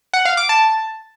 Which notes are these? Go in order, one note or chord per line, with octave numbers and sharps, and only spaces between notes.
F#5
F5
D6
A5